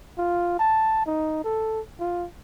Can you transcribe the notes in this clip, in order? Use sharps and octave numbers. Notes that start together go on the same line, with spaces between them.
F4
A5
D#4
A4
F4